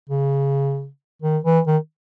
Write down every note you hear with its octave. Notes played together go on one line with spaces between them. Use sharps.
C#3
D#3
E3
D#3